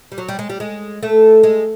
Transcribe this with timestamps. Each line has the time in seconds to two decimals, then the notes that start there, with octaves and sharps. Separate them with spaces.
0.12 G3
0.18 F#3
0.29 G3
0.39 G#3
0.50 G3
0.60 G#3
1.03 A3
1.43 G#3